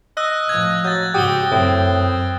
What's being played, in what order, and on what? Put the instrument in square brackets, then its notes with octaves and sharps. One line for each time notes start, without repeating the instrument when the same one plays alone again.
[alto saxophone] D#5 [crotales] E6 F#6 A#6
[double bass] A2 F3 [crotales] G#6
[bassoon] F#3 [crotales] G6 A6
[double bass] G#2 C#3 [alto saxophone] F#4 [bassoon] G4 [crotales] D#6 G7
[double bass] F#2 [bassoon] A2 [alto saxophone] C4